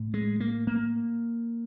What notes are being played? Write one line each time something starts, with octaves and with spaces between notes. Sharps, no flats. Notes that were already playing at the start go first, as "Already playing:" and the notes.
Already playing: A2
G#3
A#3
A#3